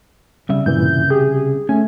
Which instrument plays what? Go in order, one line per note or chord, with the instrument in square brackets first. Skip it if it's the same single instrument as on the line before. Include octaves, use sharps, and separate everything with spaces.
[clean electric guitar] C2 C#3 E5 [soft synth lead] G3
[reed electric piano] G2 A#2 E3 [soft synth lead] G6
[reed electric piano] G4 [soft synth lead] G#4
[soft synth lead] A3 [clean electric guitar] C#4 [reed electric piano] G#5